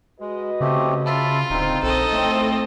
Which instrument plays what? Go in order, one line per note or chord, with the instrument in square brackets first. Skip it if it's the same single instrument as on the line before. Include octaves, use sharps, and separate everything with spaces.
[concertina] G#3 [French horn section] F#4 B4 D#5
[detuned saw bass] C#3 [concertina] A3 C4 G4
[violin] F4 [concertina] E5 A5 B5
[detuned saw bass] D1 [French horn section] D2 C4 [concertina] D#4
[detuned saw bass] A#1 [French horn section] C4 [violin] A4 D#5
[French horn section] A2 C4 [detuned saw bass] A3